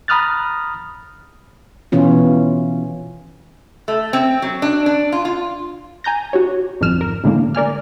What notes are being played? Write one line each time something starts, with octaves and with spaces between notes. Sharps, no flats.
A#5 B5 D#6 F6 F#6 A6
B2 E3 C#4 F4
A3
C4
F#3
D4
D4
F4
F4
G#5 A#5 G6 A#6
F#4 G4 C#5
G1 F2 G#2 F3 F6 E7
A#4
C2 A2 D3 G#3 A#3
A#4 D5 G#5 F6